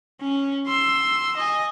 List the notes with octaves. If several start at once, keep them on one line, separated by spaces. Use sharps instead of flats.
C#4
C6 E6
D#5 G#5